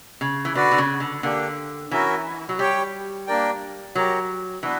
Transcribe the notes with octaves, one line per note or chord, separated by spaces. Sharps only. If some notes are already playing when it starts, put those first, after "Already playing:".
C#3
E3
D3 F#4 B4 D5
D3
C#3
D3
D3 A#3 D4 G4
E3 C#4 F#4 A#4 E5
F#3
G3 G4 C#5 G5
A#3 D4 A#4 D5 G5
F#3 G4 A#4 C#5
E3 B3 D4 F#4 B4